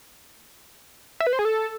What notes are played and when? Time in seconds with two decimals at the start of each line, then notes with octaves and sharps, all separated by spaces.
1.20 E5
1.27 B4
1.33 C5
1.39 G#4
1.45 A4